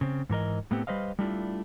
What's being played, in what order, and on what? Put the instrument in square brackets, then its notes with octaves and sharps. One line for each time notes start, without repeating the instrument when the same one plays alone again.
[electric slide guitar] C#3 C4
G#2 E3 A#4 D#5
A2 A3 B3 C4 G4
G3 B4 C5 D#5 F5
G3 A3 D4 E4 F4